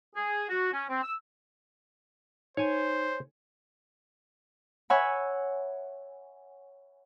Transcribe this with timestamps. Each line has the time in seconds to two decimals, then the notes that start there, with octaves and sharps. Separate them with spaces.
0.15 G#4
0.49 F#4
0.71 C#4
0.90 C4
1.03 E6
2.57 D#4 C5 C#5 G#5
4.90 C#5 E5 F#5 G#5 B5